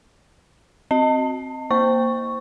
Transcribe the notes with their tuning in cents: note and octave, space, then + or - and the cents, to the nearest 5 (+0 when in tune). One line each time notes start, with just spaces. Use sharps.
C4 +0 D#5 +0 A5 +35
A#3 +0 C5 +0 C#6 +0